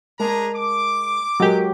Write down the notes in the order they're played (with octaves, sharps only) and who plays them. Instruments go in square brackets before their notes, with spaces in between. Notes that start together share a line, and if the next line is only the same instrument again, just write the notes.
[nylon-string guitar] G#3 A#4 A5 [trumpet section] D4 G#4 A#5
[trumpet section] D6
[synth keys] F#3 G#3 G4 [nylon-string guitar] A4 A#4 D#5